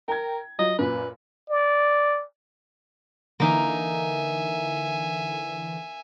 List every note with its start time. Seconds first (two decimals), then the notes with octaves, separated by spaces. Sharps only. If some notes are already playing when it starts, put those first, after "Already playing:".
0.08 A#4 G5 A#5 G#6
0.59 F#3 F4 D#5
0.79 F#2 A#2 B4
1.50 D5
3.40 D3 E3 A#3 D#4 E5 G#5